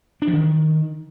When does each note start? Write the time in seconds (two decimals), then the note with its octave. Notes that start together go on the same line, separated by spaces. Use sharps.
0.22 D4
0.28 F3
0.33 D#3